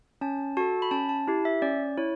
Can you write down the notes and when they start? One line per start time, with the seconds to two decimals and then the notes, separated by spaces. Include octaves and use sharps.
0.21 C#4 A5
0.57 F#4 A4 A5
0.82 B5
0.91 C#4 A5
1.09 A5
1.28 E4 G4
1.45 E5
1.62 C#4 D5
1.97 E4 C#5